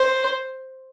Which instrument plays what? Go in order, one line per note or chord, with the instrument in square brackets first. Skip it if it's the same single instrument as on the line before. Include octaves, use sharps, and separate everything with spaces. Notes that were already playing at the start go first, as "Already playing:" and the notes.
Already playing: [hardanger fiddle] C5